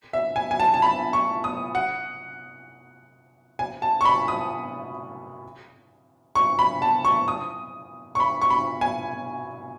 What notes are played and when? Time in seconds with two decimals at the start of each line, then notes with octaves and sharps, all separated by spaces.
0.13 E5
0.36 G#5
0.51 G#5
0.60 A5
0.74 A5
0.82 B5
1.13 C#6
1.44 D#6
1.75 F#5
3.59 G#5
3.82 A5
4.01 C#6
4.05 B5
4.28 D#6
6.35 C#6
6.59 B5
6.82 A5
7.05 C#6
7.28 D#6
8.15 C#6
8.20 B5
8.42 C#6
8.50 B5
8.81 G#5